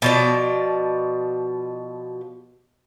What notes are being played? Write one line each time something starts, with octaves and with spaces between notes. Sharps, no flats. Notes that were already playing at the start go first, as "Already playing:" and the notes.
B2 F3 D5